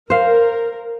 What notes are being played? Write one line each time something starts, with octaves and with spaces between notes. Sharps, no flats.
A#4 C5 F5